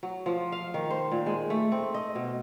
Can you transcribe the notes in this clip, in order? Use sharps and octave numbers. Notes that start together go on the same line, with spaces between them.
F#3
F3
F5
D#3
C5
A#2
G#3
A3
C4
D#5
B2